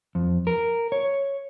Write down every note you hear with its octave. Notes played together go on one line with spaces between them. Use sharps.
F2
A#4
C#5